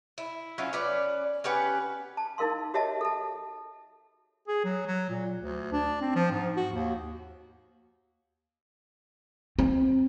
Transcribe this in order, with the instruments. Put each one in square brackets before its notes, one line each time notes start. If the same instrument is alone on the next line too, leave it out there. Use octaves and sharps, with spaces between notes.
[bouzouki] E4
F#3 C#4 E4 F4
C#4 B4 D5
C#4 G4 B4 F#5
[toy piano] A5
D#4 E4 A#4 F5 C6
F#4 G4 C#5 D#5 E5 A5
A4 A5
[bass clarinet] G#4
F#3
F#3
A#2
D2
D4
C4
F3
G#2
F#4
D#2
[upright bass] C4